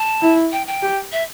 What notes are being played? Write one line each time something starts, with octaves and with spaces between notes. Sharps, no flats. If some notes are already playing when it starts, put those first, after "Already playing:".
Already playing: A5
E4
G5
G5
G4
E5